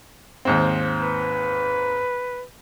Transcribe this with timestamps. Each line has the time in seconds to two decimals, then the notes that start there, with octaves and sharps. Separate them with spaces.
0.45 D#2 G#2 C4
1.02 B4